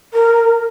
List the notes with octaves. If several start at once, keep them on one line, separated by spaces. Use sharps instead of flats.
A#4